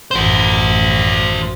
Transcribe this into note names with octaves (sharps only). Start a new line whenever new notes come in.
A1 F#2 F#4 C5